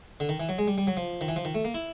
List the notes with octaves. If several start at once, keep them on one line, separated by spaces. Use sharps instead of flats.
D3
D#3
E3
F#3
G#3
G3
G3
F#3
F3
D#3
E3
F3
D#3
A3
A#3
E4